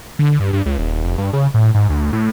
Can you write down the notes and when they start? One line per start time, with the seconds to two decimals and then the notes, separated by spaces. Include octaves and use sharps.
0.19 D3
0.40 G2
0.53 G2
0.66 C#2
0.78 D#1
1.04 F1
1.18 G2
1.33 C#3
1.54 A2
1.75 G#2
1.89 D2
2.13 A2